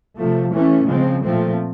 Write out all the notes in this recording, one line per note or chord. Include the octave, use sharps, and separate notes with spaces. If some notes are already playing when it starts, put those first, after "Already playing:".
C3 F3 A3
E3 A3 C#4
C#3 F3 G#3 C4
A#2 F3 A3 C4